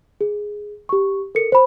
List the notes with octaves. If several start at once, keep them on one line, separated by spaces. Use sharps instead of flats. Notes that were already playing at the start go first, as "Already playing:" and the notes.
G#4
G4 C#6
A4 A#4 C#7
C5 B5